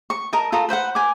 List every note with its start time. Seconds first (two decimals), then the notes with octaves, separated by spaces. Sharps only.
0.10 C#6
0.33 A#4 D#5 A5
0.52 F4 A4 A#5 D#6
0.69 B4 C5 F5 F#5
0.95 G#5 D6